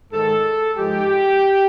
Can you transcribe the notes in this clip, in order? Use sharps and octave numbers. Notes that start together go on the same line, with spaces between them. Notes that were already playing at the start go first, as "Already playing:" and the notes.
G#2 D#3 G#3 A4
G#2 F3 G#3 G4